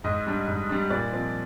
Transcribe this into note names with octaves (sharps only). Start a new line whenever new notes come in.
G#2 D#5
G3 D4
G#2
G3 D4
A#2 D5
F3 C4